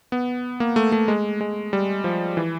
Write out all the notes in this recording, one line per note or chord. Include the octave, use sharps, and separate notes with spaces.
B3
A#3
A3
A3
G#3
G#3
G3
F3
E3